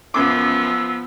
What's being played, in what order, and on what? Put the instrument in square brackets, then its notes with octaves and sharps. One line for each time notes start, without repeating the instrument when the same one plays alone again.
[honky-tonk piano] F#2 D6 [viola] F3 B3 [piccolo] E6